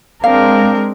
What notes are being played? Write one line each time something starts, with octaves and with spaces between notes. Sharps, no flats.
G#3 C4 D4 A#4 F5